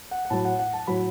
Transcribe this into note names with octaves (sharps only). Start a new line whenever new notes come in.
F#5
F#5
A2 F#3 A5
F#5
F#5
A5
A2 F#3 B5